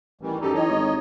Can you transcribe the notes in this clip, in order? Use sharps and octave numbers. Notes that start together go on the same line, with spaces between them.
A1 D#3 E3 G3
F#2 D#4 G4 A4
E3 C#5 D#5
G#1